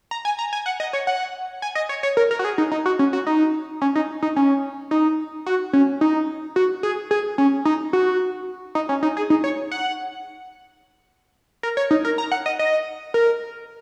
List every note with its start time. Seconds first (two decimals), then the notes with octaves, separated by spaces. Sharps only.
0.11 A#5
0.25 G#5
0.39 A#5
0.53 G#5
0.66 F#5
0.80 D#5
0.93 C#5
1.07 F#5
1.62 G#5
1.75 D#5
1.89 C#5
2.03 C#5
2.17 A#4
2.31 A#4
2.39 F#4
2.44 G#4
2.58 D#4
2.71 D#4
2.86 F#4
2.99 C#4
3.13 F#4
3.27 D#4
3.82 C#4
3.96 D#4
4.23 D#4
4.36 C#4
4.91 D#4
5.46 F#4
5.73 C#4
6.01 D#4
6.56 F#4
6.83 G#4
7.11 G#4
7.38 C#4
7.65 D#4
7.93 F#4
8.75 D#4
8.89 C#4
9.03 D#4
9.17 G#4
9.30 D#4
9.44 C#5
9.71 F#5
11.63 A#4
11.77 C#5
11.91 D#4
12.05 A#4
12.18 A#5
12.32 F#5
12.46 D#5
12.59 D#5
13.14 A#4